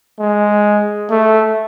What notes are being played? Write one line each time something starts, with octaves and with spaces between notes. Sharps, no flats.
G#3
A3